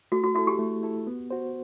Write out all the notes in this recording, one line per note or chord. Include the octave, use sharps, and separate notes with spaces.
A3 F#4
F#4
E4 F#4 A4
G4
A3
E4 A4
B3
F#4 C5